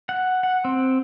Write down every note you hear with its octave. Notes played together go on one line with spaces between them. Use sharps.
F#5
F#5
C4